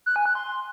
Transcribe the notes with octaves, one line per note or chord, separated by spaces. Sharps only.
F#6
G#5
F#6
C6